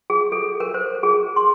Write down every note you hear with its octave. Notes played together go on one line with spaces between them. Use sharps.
G#4
A4
A#4
C5
G#4
C6